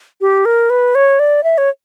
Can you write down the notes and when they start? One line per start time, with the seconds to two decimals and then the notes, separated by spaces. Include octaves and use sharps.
0.21 G4
0.45 A#4
0.70 B4
0.95 C#5
1.19 D5
1.44 E5
1.58 C#5